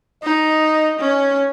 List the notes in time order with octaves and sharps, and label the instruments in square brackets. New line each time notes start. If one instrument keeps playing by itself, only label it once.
[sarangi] D#4 [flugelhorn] D#5
[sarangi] C#4